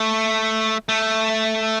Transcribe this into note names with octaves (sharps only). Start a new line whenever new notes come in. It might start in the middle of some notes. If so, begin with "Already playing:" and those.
Already playing: A3
A3